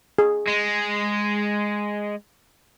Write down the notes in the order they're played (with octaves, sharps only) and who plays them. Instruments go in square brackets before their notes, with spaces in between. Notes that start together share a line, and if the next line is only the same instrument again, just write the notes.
[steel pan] G#4
[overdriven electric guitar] G#3